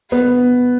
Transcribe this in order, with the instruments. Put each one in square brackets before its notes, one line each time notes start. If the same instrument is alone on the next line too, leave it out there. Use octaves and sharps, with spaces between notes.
[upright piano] B3